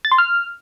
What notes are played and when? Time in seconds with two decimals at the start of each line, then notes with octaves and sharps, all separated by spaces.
0.05 A6
0.12 C6
0.18 F6